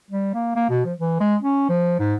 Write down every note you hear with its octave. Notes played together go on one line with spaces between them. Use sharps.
G3
A#3
A#3
B2
F3
E3
G#3
C#4
F3
G#2